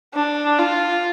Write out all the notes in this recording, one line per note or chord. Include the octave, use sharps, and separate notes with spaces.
D4
F4